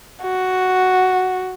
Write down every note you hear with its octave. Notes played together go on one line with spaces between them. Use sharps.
F#4